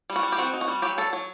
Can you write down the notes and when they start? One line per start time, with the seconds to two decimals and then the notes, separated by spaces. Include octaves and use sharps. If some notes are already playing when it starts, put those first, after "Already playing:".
0.10 G3
0.16 F#4
0.23 G3
0.32 G4
0.38 C4 F#4
0.53 D#4
0.61 F#4
0.68 G3
0.82 F#3 G4
0.98 F#3 A4
1.13 F#3